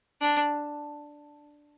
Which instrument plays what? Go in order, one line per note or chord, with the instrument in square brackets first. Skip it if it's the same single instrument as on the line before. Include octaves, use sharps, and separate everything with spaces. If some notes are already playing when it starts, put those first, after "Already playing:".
[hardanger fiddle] D4